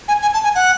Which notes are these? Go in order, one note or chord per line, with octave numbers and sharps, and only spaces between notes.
G#5
G#5
A5
G#5
F#5